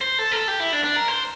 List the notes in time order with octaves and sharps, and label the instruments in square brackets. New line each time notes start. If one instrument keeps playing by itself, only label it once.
[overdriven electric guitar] C5
A4
A#4
A4
G4
E4
D4
D4
A#4
C5